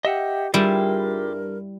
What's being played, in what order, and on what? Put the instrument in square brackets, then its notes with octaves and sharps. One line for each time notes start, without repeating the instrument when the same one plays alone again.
[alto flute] G4 [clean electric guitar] D#5 E5 F#5
[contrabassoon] G2 [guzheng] G3 E4 [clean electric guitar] F4 G4 G#4 [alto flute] A#4